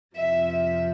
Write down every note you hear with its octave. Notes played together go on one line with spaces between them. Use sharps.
F2 C3 F3 E5
E5